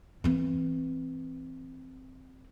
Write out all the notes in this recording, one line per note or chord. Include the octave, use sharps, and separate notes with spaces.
E3 C4